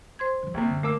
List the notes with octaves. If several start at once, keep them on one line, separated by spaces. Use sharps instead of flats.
C5 C6 G#6
D3 F3
C2 G2 C3 A#3
F#2 D3
A3 A#3 D6 E6